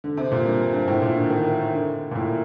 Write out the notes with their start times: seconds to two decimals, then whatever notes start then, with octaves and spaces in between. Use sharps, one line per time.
0.04 D3
0.17 C3
0.32 A#2
0.45 G2
0.73 G2
0.88 A2
1.02 A#2
1.16 D3
1.30 D#3
1.73 D3
2.11 A#2
2.15 A2